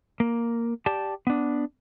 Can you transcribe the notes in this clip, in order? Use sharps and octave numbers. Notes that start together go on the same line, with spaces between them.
A#3
G4 D5 A5
B3 D4